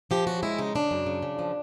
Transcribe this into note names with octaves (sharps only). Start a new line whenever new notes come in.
F3 G4
C#3 F#4
G#3 E4
C#3 D#4
C#3 D4
F#2
C#3
C#3
F3